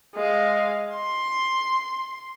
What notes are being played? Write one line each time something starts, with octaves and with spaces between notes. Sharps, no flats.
G#3 F5
C6